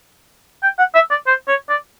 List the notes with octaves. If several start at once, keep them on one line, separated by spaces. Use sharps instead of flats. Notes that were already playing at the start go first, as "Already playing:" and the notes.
G5
F#5
E5
D5
C5
C#5
D5